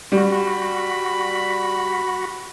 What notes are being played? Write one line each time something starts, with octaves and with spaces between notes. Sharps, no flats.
G3 F#4 B5